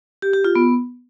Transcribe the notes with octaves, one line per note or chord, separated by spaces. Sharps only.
G4
G4
F4
B3